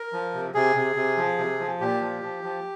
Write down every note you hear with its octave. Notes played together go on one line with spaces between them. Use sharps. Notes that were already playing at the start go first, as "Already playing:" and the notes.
Already playing: A#4
F3
C3
C3 G#4
C3
C3
F3
C3
F3
A#2 G4
F3
F3
F3